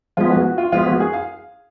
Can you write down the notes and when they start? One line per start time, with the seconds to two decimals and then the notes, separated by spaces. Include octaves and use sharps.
0.17 F3 G#3 B3 F4
0.31 F#4
0.45 F#4
0.58 F4
0.72 F3 G#3 B3 F4
0.86 F#4
1.00 G#4
1.13 F5